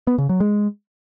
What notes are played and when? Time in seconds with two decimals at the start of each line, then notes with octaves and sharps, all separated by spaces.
0.07 B3
0.18 C#3
0.29 F#3
0.40 G#3